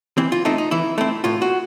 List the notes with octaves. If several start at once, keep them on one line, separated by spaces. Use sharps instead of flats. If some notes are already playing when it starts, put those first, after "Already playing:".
E3 C4
F4
A3 C4 D#4
D#4
E3 E4
A3 C4 E4
A2 F4
F#4